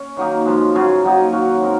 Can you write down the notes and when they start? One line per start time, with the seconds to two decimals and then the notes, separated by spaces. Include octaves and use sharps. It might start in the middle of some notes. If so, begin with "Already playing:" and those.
Already playing: C#4
0.17 D#3 F#3 A#3 D#4
0.46 F#2 F3 G#3
0.75 C#3 F#3 C#4 G#4
1.04 F#3 A#3 D#4
1.32 D#3 A#3 C#4 F#4
1.61 G#3 C4 D#4 A#4